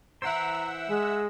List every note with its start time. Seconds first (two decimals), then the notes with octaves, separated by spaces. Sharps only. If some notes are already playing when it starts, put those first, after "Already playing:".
0.22 E3 E4 C5 E5 F#5 A#5 E6
0.88 G#3